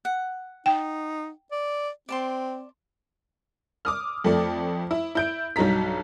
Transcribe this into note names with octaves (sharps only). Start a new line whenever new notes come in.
F#5
D#4 G5
D5
C4 D5 A5 C6
D6 D#6 F6
F2 A3 D5
E4
E4 G6 D7
B1 G2 F#3 D#4 A#5 B6